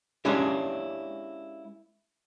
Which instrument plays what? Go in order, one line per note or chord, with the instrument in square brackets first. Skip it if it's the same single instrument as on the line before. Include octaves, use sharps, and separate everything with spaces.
[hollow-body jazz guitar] G#3 A#3 C#4 D4 E4 G4